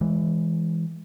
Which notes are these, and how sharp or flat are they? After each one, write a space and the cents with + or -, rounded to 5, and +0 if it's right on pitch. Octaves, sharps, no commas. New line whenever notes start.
E3 +0 G#3 +0